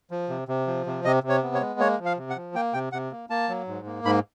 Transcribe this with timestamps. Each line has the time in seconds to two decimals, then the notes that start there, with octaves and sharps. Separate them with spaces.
0.11 F3
0.29 C3
0.48 C3
0.67 F3
0.86 C3
1.05 C3 D#5
1.23 C3
1.29 C#5
1.43 B3
1.55 C#5
1.60 G#3
1.80 A#3 C#5
1.99 F3
2.05 F5
2.17 C3
2.30 F#5
2.36 F3
2.54 A#3 G5
2.74 C3 G5
2.92 C3 F#5
3.12 A#3
3.30 A#3 A5
3.49 F#3
3.67 G#2
3.86 A#3
4.05 G#2 B5